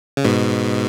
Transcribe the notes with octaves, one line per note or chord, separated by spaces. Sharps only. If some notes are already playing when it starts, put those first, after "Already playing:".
C#3
G#2 B2